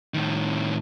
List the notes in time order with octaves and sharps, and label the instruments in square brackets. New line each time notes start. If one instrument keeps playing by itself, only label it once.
[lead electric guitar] A2 D#3